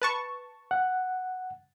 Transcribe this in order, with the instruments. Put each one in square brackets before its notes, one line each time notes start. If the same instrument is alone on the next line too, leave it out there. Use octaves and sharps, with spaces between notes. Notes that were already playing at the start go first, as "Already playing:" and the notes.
[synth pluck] B4 A5 C#6
[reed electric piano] F#5